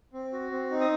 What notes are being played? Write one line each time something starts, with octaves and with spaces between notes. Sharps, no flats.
C4
F#4
C4
D#4
D#6